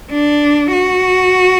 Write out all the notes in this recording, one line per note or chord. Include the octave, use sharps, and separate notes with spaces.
D4
F#4